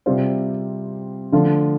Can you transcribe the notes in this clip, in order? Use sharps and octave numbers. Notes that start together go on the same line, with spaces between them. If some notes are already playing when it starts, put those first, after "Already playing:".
C3 G3 C4 F4 C5
D3 F3 A3 F4